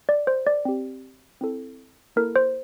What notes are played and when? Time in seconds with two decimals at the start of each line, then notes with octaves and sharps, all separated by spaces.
0.09 D5
0.27 C5
0.47 D5
0.65 C4 G4
1.41 C4 E4 A4
2.16 A#3 E4 A4 A#4
2.36 C5